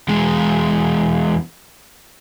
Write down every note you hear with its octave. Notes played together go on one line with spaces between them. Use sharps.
E2 G#3